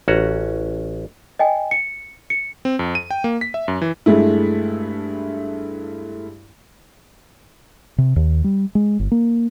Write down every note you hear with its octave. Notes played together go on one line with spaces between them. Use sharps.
A1 C#4 F#4 A#5
D#5 G5 G#5
C#7
C#7
C4
F2
D#7
G5
A#3
B6
E5
F#2
E3
G2 G#3 A3 E4
C3
D#2
G3
G#3
G1
A#3